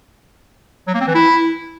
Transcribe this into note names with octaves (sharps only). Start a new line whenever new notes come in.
F#3
A#3
C4
E3
E4